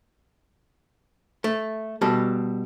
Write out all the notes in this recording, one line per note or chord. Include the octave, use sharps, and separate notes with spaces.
A3
B2 G3 A4